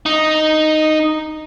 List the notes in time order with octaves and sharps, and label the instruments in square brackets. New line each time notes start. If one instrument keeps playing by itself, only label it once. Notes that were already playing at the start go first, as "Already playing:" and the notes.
[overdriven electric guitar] D#4